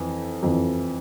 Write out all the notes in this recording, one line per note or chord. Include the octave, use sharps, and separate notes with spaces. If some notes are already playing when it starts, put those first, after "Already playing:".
Already playing: F2 E3
F2 E3